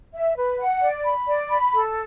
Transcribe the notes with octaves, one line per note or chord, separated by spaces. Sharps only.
E5
B4
F#5
D5
B5
D5
B5
A4